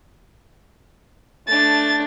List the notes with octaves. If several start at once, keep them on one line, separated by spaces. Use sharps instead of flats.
A3 D4 A6